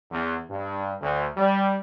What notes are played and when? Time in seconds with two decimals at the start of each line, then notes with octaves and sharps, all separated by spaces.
0.11 E2
0.50 G2
1.01 D2
1.37 G3